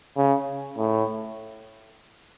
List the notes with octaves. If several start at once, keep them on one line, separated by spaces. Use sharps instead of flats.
C#3
A2